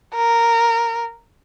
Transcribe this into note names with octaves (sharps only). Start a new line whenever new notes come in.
A#4